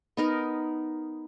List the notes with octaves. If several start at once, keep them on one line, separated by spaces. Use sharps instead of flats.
B3 D#4 A#4